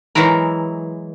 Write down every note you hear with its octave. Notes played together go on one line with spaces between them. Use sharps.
E3 F#3 G#3 E4 A#4